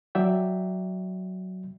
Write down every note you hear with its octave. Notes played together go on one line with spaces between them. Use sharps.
F#3 D5 E5 G5